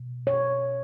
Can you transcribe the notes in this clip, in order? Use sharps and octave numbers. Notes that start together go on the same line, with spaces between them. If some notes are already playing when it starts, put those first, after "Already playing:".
Already playing: B2
C#5